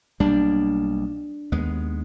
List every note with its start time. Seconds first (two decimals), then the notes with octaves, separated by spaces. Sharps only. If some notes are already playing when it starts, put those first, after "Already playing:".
0.20 B1 G3 A#3 D4
1.52 D#2 G#3 B3